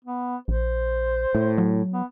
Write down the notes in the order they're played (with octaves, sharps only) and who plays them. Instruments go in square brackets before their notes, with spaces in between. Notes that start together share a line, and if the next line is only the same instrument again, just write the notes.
[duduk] B3
[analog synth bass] A#1 [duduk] C5
[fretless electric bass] A2
[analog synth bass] F#3
[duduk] B3